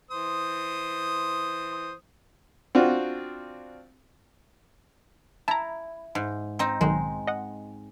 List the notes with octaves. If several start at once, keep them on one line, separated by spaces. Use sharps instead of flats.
E3 C5 D#6
C4 D4 F4 F#4
E4 A5 A#5
G#2
C4 D#4
B1 D#3 G#3
D#5 F#5